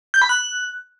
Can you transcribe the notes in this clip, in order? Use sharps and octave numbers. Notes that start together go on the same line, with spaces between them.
G6
B5
F#6